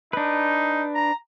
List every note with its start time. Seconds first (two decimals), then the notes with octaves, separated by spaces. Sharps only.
0.13 D4 D#4 B4
0.95 A#5